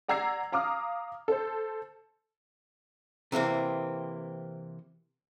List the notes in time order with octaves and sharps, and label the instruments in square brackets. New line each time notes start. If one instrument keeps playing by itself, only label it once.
[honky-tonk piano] D5 F#5 A#5 E6 G#6 C7
F5 A#5 D6 D#6 F6
A4 C5
[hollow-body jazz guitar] C3 E3 A#3 C4